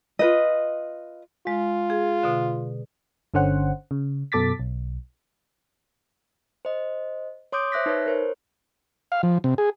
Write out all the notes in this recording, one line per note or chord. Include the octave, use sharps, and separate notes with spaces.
F4 B4 D#5
G#3 F4
G#4
B2 D3
G1 D3 C#4 C5 F#5
C#3
F#2 B2 A4 D6 A6 B6
B1
C5 D#5
C#5 C6 D6 D#6 G6 D7
C5 E5 F#6 A#6 B6
D#4 B4 C#5
A#4 C5 C#5
F5
F3
C3
G#4